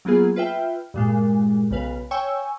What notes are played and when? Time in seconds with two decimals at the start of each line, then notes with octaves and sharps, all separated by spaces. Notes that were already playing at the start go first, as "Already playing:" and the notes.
0.05 F#3 A#3 B3 F4 G#4
0.36 F4 B4 E5 G5
0.94 G2 A#2 G#3
1.71 B1 C#3 B4 F5
2.11 C#5 G5 G#5 C#6 E6